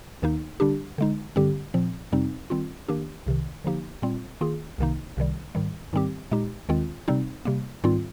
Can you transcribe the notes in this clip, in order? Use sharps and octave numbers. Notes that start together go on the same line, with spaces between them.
D#2 D#3 A#3 D#4
D3 G3 D4 G4
D3 G#3 D#4
G2 D3 G3 C4 G4
A#2 F3 C4
F2 C3 G3 C4 D#4
D#3 G3 C4 F4
D#3 A#3 D4 G4
C2 C3 D#3
D3 F3 A#3 D#4 G4
A#2 G3 C4 F4
D#3 A#3 F4 G#4
C2 C3 D#3 A#3 D#4
C2 C3 D#3 G3
G#2 D#3 G3
G#2 D#3 G3 C4 G4
A#2 G#3 D#4 G4
D#2 D#3 G#3 C4 F4
C3 G3 C4 D#4
C3 G3 A#3
G#2 D#3 G3 C4 F4